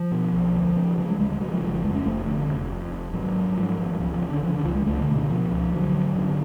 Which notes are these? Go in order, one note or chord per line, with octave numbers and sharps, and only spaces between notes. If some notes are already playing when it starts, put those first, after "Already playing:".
Already playing: F3
B2
B1
D2
C#3
C#3 F#3
G#3
D2 G#3
G#3
C#3 F#3
F3
F1 F3
F3
F2 G#3
C#4
F1 A3
D3
F1
F2
F1
G#1 F#3
G#2
G#2 F3
G#1
F#3
C#2 F3
F3
C#3
D3
C#3 F3
D3
C#2 F3
G#3
C#2 A3
D3
B2
D3
B2 F3
C#2
D3 F#3
G#1 F#3
F#2 D3